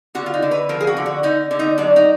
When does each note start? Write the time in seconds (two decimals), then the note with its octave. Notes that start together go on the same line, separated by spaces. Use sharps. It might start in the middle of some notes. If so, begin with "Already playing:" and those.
0.15 D3 F#4
0.26 F4
0.34 D#4
0.42 D3
0.51 B4
0.69 F3 A#4
0.80 G#4
0.87 F#4
0.97 D3
1.06 F#4
1.23 D3 D#4
1.51 D3
1.59 D#4
1.78 F#3 D4
1.96 D#4